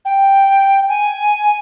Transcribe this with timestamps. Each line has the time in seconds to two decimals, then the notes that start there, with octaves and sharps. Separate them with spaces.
0.05 G5
0.89 G#5